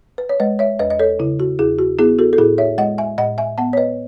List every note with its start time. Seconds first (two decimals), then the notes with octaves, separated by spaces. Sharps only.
0.18 B4
0.29 C#5
0.40 G#3 B4 D#5
0.59 C#5 E5
0.79 E2 B4 D#5
0.90 D#5
0.99 A4 C#5
1.19 C#3 E4
1.40 F#4
1.59 E2 E4 G#4
1.79 F#4
1.99 B3 E4 G#4
2.19 F#4 A4
2.33 A4
2.38 A2 E4 G#4
2.58 C#5 E5
2.78 G#3 D#5 F#5
2.98 E5 G#5
3.18 A2 D#5 F#5
3.38 E5 G#5
3.58 B3 F#5 A5
3.73 C#5
3.77 B4 D#5